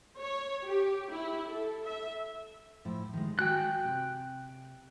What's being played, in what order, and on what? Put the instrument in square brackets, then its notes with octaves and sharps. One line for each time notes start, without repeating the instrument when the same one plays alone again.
[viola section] C#5
G4
E4
A4
E5
[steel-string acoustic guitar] A2 F3 E4
D#3 G#3
[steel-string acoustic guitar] F#4 G#5 [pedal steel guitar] G5 F#6
[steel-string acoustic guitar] C3